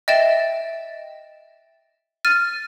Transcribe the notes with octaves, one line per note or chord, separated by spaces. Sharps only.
D#5 E5 G5 A6 E7
F6 A6 D#7